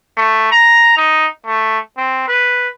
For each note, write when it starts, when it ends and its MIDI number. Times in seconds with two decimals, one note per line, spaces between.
0.17 0.49 57
0.51 0.96 82
0.97 1.28 63
1.46 1.78 57
1.97 2.23 60
2.28 2.69 71